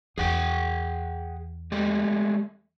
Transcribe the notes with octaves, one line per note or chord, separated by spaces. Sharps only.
E2 G#4 F#5 G5
G#3 A3 G4